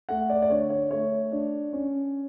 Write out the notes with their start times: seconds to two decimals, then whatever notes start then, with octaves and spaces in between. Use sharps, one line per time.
0.09 A3 F#5
0.30 D5
0.42 D5
0.50 D3 C#5
0.70 C#5
0.91 A3 C#5
1.32 D4
1.73 C#4